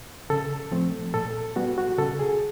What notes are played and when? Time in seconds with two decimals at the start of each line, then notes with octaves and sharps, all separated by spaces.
0.30 C#3 A4
0.71 F3 A3 C4
1.14 A#2 A4
1.56 G3 B3 F#4
1.78 F#4
1.98 C#3 A4
2.19 G#4